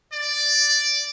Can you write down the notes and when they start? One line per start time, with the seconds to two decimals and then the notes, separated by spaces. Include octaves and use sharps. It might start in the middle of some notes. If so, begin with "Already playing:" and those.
0.12 D5